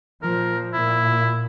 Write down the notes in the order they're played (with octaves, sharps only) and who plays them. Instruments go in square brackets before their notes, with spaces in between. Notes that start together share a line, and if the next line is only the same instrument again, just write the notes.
[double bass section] A#2 F3 [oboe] A#4
[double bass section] A#2 [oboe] E4